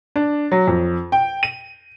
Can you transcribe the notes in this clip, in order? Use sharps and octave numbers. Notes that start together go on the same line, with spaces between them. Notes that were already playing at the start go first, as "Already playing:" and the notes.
D4
F#3
F2
G5
D#7